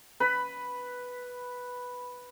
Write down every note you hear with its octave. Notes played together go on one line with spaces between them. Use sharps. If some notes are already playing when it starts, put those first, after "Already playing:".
B4 B5